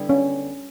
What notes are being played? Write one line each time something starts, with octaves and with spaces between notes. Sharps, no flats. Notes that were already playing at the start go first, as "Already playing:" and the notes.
Already playing: D3 G3 B3 E4
C#4